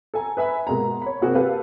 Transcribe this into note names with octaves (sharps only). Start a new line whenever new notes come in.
A4 G#5 A#5
B4 E5 G#5 B5
B2 G#3 A#3 A#5
C#5 B5
C3 A#3 C4 F#4 G#4
A#3 G4 A4 B4 F5